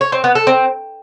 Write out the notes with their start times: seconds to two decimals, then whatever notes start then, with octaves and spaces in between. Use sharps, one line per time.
0.01 C#5
0.12 C4
0.24 B3
0.35 A4
0.47 C4